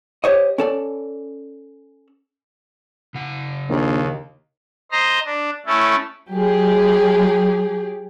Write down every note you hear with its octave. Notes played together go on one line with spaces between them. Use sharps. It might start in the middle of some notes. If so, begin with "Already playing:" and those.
G4 C5 C#5 D#5
C#4 A4 D5
C#3 F#5
A#1 D#2
C5 D#5 A#5 C6
D4
A3 C#4 E4 A4
F#3 G4 G#4